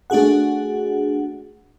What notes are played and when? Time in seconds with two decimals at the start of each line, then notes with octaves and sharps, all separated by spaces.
0.10 A3 D4 F#4 G#4 F#5